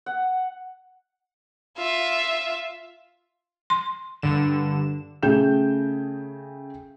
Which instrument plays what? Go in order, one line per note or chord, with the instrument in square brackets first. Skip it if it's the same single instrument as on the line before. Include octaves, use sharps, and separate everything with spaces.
[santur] F#5
[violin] F4 E5
[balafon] C6
[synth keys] G2 D3 E7
[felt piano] C#3 A3 G#4 G5 G6 E7